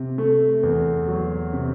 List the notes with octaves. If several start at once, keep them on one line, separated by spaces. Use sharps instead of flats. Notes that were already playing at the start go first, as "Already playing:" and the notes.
Already playing: C3
A3
E2
F#3
C3